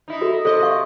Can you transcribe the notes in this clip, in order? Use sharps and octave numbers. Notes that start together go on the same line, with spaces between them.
D#4 E4
F#4 A4
D#5
C3 A4 D#5
F5 C#6